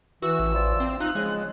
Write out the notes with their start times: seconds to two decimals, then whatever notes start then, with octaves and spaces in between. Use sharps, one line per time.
0.22 E3 F#4 E6
0.39 A1
0.55 F3 C5 D5
0.80 C4
1.00 F3 D#4 F5 F#6
1.15 C#3 F3 G#3